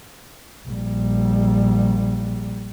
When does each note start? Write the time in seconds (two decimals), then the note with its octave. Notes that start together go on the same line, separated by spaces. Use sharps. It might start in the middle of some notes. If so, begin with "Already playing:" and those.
0.68 A#1 G3